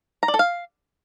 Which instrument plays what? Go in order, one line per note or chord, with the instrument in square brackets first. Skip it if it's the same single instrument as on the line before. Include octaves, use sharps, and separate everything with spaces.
[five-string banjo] A#5
D5
A4
F5